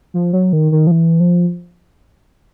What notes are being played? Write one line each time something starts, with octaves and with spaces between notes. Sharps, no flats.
F3
F#3
D#3
D#3
F3
E3
F3